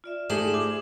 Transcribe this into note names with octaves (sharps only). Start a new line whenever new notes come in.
F4 D5 E5
G#2 A3 G4 G#4 E7 F#7
D6